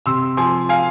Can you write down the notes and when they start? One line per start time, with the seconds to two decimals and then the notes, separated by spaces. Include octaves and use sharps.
0.06 C3 C6 E6
0.37 F3 G#5 C6
0.69 F5 G#5